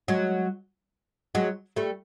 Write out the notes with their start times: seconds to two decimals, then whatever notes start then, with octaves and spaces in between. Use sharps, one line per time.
0.08 F#3 G#3
1.35 F#3 G#3
1.76 G3 A3